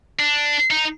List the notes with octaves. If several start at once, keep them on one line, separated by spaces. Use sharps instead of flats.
D4
D#4